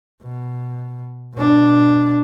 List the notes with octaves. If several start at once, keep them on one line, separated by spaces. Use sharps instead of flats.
B2
B2 D4